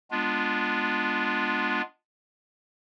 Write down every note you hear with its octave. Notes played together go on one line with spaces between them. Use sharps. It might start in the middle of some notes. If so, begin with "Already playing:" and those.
G#3 B3 D4 F4